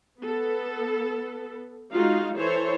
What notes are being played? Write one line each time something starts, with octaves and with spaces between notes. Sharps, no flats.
B3 A4
G#3 D#4 F4 F#4 F5
E3 E4 A4 C5 C#5